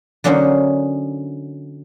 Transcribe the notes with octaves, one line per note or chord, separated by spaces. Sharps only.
D3 F#3 A#3 C#4 D#4 C5